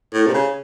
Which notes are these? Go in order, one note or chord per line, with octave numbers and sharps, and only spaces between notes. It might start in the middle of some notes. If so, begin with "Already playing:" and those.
A2
C3
C#3